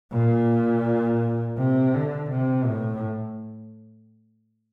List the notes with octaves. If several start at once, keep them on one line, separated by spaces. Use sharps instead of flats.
A#2
C3
D3
C3
A2